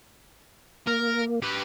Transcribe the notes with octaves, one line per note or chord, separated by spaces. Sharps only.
A#3 A#4
G4 B4